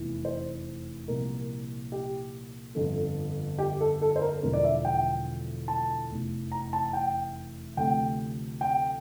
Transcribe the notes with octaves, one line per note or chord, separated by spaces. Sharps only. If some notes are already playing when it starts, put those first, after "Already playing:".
Already playing: F1 E2 E3
C5
C2 A#2 F3 A#4
G4
G1 F2 D3 F3 A4
G4
A4
A4
C5
A#4
E1 E2 D3 F3 A#4
D5
E5
G5
A5
F1 E2 E3
A#5
A5
G5
D2 C3 F3 G5
G5